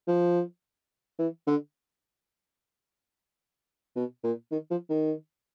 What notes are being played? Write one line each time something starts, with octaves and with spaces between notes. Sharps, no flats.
F3
E3
D3
B2
A#2
D#3
F3
D#3